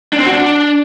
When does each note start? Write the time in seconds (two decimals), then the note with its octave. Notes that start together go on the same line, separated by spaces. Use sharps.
0.13 D4
0.19 C4
0.26 F#4
0.33 D4